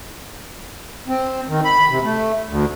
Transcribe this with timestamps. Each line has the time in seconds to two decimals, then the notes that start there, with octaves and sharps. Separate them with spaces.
1.08 C4
1.49 D#3
1.65 B5
1.90 C3
2.04 A3
2.49 D2